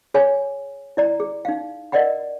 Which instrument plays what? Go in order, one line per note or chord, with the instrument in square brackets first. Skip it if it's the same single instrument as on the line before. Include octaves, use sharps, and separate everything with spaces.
[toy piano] G#4 C#5 G#5 B5
E4 D5 A#5
G#4
D#4 F5
A#4 D5 D#5 F#5 B5